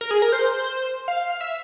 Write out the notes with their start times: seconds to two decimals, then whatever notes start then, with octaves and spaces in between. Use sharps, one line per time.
0.01 A#4
0.11 G#4
0.22 A#4
0.32 C5
1.08 F5
1.41 E5